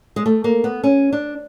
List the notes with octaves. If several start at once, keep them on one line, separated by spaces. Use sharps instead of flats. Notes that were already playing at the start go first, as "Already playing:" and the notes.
G#3
A3
A#3
B3
C#4
D4